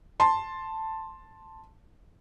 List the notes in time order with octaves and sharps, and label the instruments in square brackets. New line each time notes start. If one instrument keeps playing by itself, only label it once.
[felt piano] A5 C6